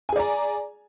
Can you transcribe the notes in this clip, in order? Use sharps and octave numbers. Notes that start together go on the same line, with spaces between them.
G#4 D5 G#5 A#5